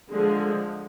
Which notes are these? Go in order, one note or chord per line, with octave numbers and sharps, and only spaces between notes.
D3 F3 G#3